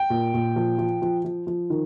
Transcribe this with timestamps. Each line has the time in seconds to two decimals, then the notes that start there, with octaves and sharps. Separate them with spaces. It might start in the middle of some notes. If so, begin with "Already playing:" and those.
Already playing: G5
0.10 A#2
0.34 A#2
0.56 F3
0.78 F3
1.02 F3
1.24 F3
1.47 F3
1.70 D#3